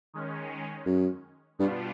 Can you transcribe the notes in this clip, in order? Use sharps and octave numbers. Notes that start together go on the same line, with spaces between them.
D#3 G#3 C#4
F#2
G2 B2 G3 B3 D4 F4